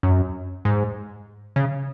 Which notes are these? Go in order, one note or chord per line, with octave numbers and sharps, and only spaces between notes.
F#2
G#2
C#3